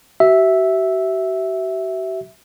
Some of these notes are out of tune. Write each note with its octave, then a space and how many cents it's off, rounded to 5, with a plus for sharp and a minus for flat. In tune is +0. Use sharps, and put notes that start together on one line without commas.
F#4 +45 E5 -5